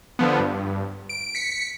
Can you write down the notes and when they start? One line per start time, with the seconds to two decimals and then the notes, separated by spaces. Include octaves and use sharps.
0.19 D3 F3 B3
0.39 G2
1.09 D7
1.35 B6 C#7